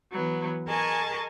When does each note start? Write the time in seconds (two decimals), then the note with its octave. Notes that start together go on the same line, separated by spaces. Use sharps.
0.11 E3 F#3 B3
0.68 G#4 A#4 D#5 G#5 A5 C#6